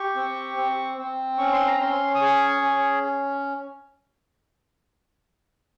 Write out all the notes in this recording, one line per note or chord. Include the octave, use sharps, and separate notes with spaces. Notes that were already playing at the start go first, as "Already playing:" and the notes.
Already playing: G4 C#6
C4
C4
C4
C#4 C#6
C6
A#5
C#4 C6
D#6
G#4 C#6
C#4